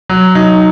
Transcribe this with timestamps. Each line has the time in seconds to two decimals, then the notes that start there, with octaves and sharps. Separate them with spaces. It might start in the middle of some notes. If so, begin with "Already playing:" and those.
0.09 F#3
0.35 F#3 D#4